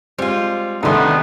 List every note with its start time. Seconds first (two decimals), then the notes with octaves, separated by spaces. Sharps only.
0.18 G3 G#3 C4 F4
0.83 C2 D3 D#3 A3 B3 D#4 A4 C6